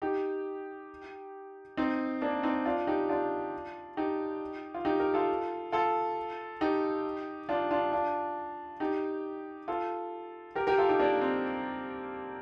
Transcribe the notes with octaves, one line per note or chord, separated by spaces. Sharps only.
D#4 G4
C4 D#4
A#3 D4
C4 D#4
D4 F4
D#4 G4
D4 F4
D#4 G4
F4
D#4 G4
G4 A#4
F4 A4
F4 A4
D#4 G4
D4 F4
D4 F4
D4 F4
D#4 G4
F4 A4
G4 A#4
G4 A#4
F4 A4
D#4 G4
A#3 D4
C4